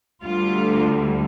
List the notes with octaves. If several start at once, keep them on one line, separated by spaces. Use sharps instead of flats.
D2 D3 G3 F4